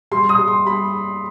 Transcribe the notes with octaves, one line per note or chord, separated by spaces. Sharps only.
G3 C6
D#6
G3
C6
G3 B5